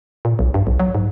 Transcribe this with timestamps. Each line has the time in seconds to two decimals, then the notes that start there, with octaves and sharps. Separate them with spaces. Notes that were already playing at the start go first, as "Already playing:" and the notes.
0.25 A#2
0.39 B1
0.54 G2
0.67 B1
0.80 F#3
0.95 G#2